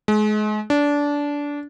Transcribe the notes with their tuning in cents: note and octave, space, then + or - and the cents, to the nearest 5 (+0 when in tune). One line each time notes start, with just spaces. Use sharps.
G#3 +35
D4 -20